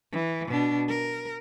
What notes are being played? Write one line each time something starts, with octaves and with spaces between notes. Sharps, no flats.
E3
B2 D4
A#4